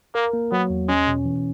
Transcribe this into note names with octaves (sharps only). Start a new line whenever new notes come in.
A#3 A#4
A#3
F#3 B3
E2
G#3 C#4
B2
E3